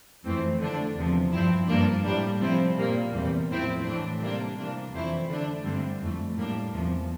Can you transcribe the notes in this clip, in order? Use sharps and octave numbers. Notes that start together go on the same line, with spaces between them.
F2 E3 A3 C4
D3 A3 D4
E2 C3 F3
G2 F3 C4 E4
G2 F3 A#3 D4
A2 G3 D4
C3 F3 C4 E4
A#2 G3 A#3
E2 C3 G3
A2 F3 C4 E4
A2 E3 A3 D4
C3 G3 A#3 D4
C3 E3 A#3 D4
F2 E3 A3 C4 E4
D3 A3 D4
G2 D3 G3 C4
F2 E3 A3
A2 G3 A#3 D4
E2 C3 F3